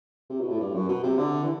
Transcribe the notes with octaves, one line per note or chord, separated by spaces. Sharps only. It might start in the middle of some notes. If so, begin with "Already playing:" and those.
C3
B2
A2
G2
F#2
B2
C3
D3
E3